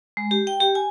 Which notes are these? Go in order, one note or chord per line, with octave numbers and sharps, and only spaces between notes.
G#3
G4
G5
G4
G#5